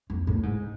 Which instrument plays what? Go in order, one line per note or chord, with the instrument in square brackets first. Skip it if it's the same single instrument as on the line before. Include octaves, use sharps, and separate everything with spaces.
[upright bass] F2
A2
G#2